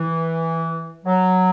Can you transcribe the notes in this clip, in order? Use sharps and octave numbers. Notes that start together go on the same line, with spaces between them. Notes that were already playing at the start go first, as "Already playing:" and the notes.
Already playing: E3
F#3